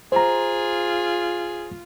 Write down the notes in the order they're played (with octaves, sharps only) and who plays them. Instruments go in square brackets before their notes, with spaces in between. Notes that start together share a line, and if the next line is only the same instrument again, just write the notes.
[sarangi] F4 [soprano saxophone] G#4 [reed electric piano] C5 A#5